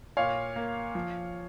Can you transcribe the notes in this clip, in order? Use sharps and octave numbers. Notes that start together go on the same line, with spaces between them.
A#2 C#5 F5
A#3
F3